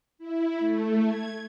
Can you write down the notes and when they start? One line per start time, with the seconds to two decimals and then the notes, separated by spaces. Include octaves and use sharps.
0.19 E4
0.59 A3
1.05 G#6